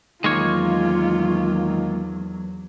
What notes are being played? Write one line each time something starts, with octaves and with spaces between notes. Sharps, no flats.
E2 D#3 F#3 G#3 A#3 F4 C#5